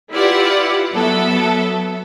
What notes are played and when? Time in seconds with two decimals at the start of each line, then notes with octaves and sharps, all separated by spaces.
0.11 E4 F4 G4 B4 D5 F#5
0.93 F#3 B3 A4 E5